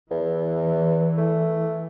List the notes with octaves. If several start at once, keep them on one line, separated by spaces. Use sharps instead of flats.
E2 E3
A3